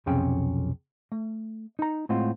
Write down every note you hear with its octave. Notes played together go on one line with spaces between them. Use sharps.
B1 F2 C3 C#4 G#4 G5
A3
D#4 A#5
A2 G#3 C4 F4 F#5 C6